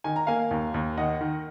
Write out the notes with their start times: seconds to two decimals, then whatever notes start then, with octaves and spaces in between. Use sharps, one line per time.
0.04 D#3 G#5
0.16 A#5
0.27 A#3 F5 G#5
0.51 D#2
0.74 D#2
0.98 D#3 D#5 F#5
1.21 D#3